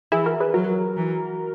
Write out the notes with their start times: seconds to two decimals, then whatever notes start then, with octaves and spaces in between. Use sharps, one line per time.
0.12 E3 E4 G#4
0.26 F#4 A#4
0.40 G#4 B4
0.54 F#3 F#4 A#4
0.97 E3